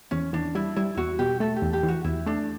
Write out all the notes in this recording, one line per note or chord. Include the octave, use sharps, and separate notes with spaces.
E2 C#4
E2 D4
G3 E4
G3 E4
E2 F#4
B2 G4
A3 A4
G4
E2
G4
E3
F#4
E2 E4
A3 D4